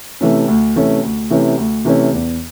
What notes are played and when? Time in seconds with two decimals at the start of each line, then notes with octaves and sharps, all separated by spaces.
0.21 C3 E3 A3 C#4
0.48 D2
0.76 C3 E3 A3 C#4
1.03 D2
1.30 C3 E3 A3 C#4
1.58 D2
1.85 C3 E3 A3 C#4
2.13 E2